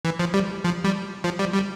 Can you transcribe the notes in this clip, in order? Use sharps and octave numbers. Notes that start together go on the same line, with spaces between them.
E3
F3
G3
F3
G3
F3
G3
G3